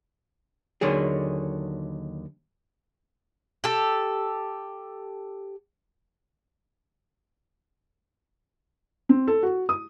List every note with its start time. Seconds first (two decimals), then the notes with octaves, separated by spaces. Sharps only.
0.81 D#2 D3 D#3 F#3 G#4
3.64 G4 A4
9.09 C4
9.28 A4
9.43 F#4
9.69 D#6